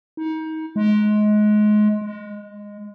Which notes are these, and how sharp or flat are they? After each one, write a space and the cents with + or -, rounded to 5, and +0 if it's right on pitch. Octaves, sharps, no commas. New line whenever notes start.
D#4 +30
G#3 +25
G#3 -10